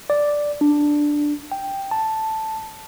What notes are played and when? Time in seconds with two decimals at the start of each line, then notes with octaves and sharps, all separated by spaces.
0.10 D5
0.61 D4
1.52 G5
1.91 A5